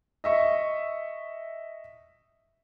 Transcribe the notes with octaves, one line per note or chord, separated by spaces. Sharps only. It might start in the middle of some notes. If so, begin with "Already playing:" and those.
D#5 E5 C#6